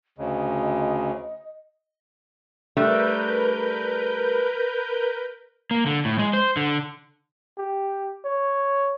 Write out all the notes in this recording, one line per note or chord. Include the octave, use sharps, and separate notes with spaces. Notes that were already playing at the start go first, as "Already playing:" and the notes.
D2 C#3 D#5
G3 A3 D4 A#4 B4 G6
A#3
D3
A2
G#3
C5
D3
G4
C#5